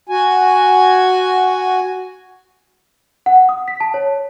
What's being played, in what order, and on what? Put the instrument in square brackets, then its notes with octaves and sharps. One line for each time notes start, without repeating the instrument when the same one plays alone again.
[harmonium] F#4 G#5
[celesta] F#5
D#6
B6
A5
C#5